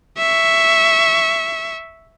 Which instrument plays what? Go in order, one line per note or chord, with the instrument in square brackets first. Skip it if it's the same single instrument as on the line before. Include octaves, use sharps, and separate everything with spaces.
[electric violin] E5 C#6